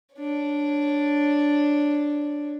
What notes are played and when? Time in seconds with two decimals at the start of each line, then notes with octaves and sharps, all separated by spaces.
0.14 D4 C#5